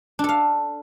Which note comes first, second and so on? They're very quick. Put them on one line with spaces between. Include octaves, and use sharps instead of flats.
D4 A4 F5